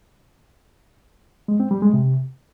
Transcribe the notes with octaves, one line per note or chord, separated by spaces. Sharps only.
G#3
C4
G3
G#3
C3